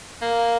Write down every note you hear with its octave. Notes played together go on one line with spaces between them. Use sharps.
A#3